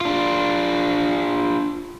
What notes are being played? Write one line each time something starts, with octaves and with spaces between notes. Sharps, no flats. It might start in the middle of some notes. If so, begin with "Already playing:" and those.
D4 F4